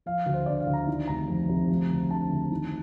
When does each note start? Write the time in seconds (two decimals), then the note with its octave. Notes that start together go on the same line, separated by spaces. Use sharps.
0.06 F3 F5
0.26 D2
0.34 C5
0.46 D3 D5
0.60 F5
0.67 D2
0.73 A#5
0.87 D#3
1.07 F1 A#5
1.28 F2
1.49 F1
1.70 F3
1.90 D2
2.09 D3 A5
2.30 D2
2.51 D#3